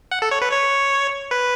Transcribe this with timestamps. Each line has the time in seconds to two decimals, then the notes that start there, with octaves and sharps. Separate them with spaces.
0.12 F#5
0.22 A4
0.31 C#5
0.42 B4
0.51 C#5
1.31 B4